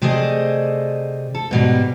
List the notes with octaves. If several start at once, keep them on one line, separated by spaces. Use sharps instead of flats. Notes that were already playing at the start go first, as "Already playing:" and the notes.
C3 A3 G#4 C5 D5 D#5
A4
G#2 B2 G3